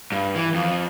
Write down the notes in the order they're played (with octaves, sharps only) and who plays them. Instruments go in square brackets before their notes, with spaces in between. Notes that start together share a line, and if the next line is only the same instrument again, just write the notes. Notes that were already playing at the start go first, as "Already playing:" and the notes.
[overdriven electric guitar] G2
E3
F2